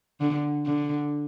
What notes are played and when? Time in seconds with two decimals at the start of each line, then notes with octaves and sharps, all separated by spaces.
0.21 D3
0.66 D3